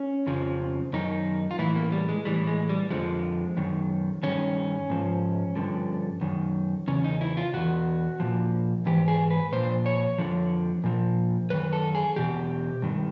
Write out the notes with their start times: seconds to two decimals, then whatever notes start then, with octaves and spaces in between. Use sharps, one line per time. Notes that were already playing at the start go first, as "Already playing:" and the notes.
Already playing: C#4
0.27 F2 C#3 F3
0.93 F#2 D#3 D#4
1.51 F4
1.59 A2 E3 E4
1.76 A#3
1.92 G3
2.09 G#3
2.25 A2 E3 G3
2.47 G#3
2.69 G3
2.91 F2 D3 F3 G#3
3.57 F#2 D#3
4.23 G2 D#3 C#4
4.90 G#2 F3
5.56 G2 D3 F3
6.21 F#2 D#3
6.88 E2 C#3 C#4
7.04 D#4
7.21 E4
7.37 F4
7.54 E2 B2 F#4
8.20 A#2 F3
8.86 G#2 E3 G4
9.08 G#4
9.30 B4
9.52 A#2 F3 C5
9.86 C#5
10.18 F2 D3 F3
10.84 A#2 F3
11.50 F#2 D#3 B4
11.73 A4
11.95 G#4
12.16 E2 B2 G4
12.82 G2 D#3